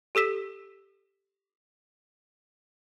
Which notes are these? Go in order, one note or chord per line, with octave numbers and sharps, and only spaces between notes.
G4 A4 E6 B6 E7